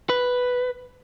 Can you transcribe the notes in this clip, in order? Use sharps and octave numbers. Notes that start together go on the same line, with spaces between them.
B4